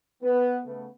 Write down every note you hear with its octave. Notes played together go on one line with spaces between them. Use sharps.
B3
C#3 A3 B3